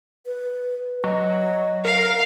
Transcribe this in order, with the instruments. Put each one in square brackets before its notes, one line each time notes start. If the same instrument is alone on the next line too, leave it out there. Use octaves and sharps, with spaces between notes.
[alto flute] B4
[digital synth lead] F#3 [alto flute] D#5
[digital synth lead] A#4 [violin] F5